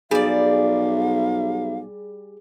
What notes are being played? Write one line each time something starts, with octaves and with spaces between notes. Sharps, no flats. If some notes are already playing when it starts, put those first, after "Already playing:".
B1 G3 G#4 D5 F5